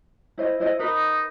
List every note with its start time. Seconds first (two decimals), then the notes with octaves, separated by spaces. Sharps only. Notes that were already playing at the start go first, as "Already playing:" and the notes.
0.38 E4 C5 D#5
0.60 E4 C5 D#5
0.79 D#4 A#4 B4 D#5